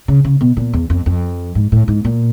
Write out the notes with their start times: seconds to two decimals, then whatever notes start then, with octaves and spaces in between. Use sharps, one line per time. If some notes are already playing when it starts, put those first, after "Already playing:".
0.08 C#3
0.24 C#3
0.41 B2
0.57 A#2
0.73 E2
0.90 F2
1.06 F2
1.55 G#2
1.72 A2
1.88 G#2
2.04 A#2